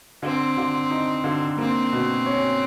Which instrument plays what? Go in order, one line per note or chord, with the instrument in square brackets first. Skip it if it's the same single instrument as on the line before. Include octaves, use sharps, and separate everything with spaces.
[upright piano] D3 [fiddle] C4
[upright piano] D3
D#4
D3
[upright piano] A#3 [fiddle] C4
[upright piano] B2
C#4